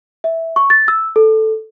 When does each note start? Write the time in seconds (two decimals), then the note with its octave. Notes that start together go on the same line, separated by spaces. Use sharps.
0.24 E5
0.56 C#6
0.70 A6
0.88 E6
1.16 A4